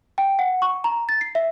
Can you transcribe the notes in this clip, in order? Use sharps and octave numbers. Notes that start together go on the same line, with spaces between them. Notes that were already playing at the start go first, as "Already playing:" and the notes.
G5
F#5
C#6
A#5
A6
C7
E5